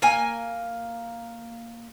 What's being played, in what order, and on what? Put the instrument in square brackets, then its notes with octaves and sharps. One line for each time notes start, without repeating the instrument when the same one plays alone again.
[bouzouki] A#3 G#5